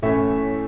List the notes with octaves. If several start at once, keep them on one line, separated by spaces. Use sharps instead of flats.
A2 E3 A3 C#4 C#5 E5